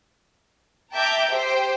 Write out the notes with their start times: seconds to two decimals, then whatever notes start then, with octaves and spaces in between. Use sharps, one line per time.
0.93 E5 G5 A5 A#5 D6 G6
1.28 G4 C5 G5